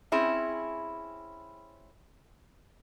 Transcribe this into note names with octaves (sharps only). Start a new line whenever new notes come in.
C4 C#4 E4 G#4